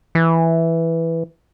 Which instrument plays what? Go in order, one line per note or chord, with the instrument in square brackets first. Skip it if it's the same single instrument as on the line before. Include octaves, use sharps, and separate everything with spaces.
[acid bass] E3